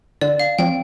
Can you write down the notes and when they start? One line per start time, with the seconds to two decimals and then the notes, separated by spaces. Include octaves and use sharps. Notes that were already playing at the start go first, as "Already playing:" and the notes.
0.21 D3 D5
0.40 F5
0.58 F3 C4 G5